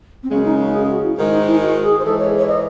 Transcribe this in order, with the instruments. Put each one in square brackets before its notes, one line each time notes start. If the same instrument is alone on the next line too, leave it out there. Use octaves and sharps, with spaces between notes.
[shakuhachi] C4
[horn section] F#2 C#3 G#3 [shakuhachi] C#4
[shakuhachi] D#4
C#4
G#4
F#4
E4
[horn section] G#2 D#3 G#3 [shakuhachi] D#4
[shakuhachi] D#4
E4
F#4
G#4
C5
[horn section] G#2 E3 G#3 [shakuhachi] A4
[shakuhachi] C#5
C#5
D#5